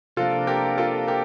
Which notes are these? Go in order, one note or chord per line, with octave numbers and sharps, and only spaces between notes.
C3 F3 A#3 D4 F4 A4
G4 A#4
F4 A4
G4 A#4